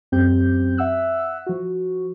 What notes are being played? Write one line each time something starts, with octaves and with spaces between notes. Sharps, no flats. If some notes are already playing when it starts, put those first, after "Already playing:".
F#2 C4 G4 G6
E5 F#5 E6 F#6
F3 F#4